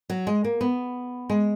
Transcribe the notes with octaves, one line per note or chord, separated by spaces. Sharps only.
F#3
G#3
A#3
B3
G#3